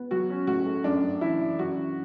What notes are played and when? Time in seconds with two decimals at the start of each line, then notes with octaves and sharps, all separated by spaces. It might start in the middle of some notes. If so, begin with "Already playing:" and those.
Already playing: B3
0.11 F#3 F#4
0.30 C#4
0.47 A2 F#4
0.66 A3
0.84 F#2 D4
1.03 F#2
1.21 E3 E4
1.40 E3
1.59 F#2 F#4
1.78 E3